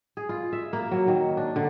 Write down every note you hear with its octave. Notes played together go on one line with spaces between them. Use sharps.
G#4
F4
E5
A#3
F#3
D#3
D4
D3